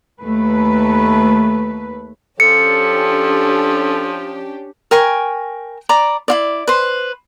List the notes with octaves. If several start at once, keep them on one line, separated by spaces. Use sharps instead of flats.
D#2 A3 B4
F3 C#4 D4 G4 A4 C#7
A#4 G5 G#5 C#6
D5 A#5 B5
E4 F4 D5
B4 C5